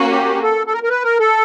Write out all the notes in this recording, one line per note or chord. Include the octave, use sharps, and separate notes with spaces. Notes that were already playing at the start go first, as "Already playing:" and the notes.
Already playing: A#3 C#4 F#4
G4
A4
A4
A#4
A#4
B4
A#4
A4